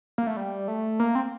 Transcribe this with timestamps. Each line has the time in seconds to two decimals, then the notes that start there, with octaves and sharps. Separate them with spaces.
0.18 A#3
0.27 A3
0.37 G3
0.68 A3
1.00 A#3
1.15 C4